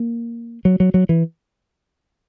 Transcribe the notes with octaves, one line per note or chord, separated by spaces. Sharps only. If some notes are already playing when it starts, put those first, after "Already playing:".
Already playing: A#3
F#3
F#3
F#3
E3